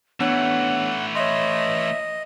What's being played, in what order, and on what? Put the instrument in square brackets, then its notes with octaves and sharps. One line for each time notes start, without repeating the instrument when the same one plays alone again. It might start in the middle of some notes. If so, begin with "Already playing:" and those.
[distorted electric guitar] E3 A3 [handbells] B3 D4 C#5 [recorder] F#5
[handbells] C#5 C6 [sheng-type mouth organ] D#5 [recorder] E5